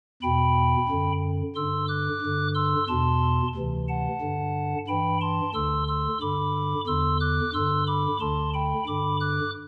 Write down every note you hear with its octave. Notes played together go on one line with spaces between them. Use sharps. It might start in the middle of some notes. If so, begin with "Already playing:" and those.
E2 B2 G5 B5
F#2 D3
G2 D3 C6 E6
D6 F#6
G2 D3
C6 E6
E2 B2 A5 C6
D2 C3 E3
F#5 A5
G2 D3
G2 E3 G5 B5
A5 C6
D2 D3 C6 E6
C6 E6
G2 D3 B5 D6
E2 D3 C6 E6
D6 F#6
G2 D3 C6 E6
B5 D6
D2 D3 A5 C6
G5 B5
G2 D3 B5 D6
D6 F#6